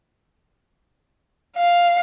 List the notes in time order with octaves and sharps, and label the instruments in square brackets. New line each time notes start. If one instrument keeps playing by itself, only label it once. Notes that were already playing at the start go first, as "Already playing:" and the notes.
[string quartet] F5